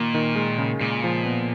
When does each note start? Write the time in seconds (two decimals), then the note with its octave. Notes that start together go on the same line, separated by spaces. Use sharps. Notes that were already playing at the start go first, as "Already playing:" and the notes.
Already playing: A#2 D#3 A#3
0.14 D#3
0.36 G#3
0.58 C#3
0.81 A#2 G#3
1.04 F3
1.25 B3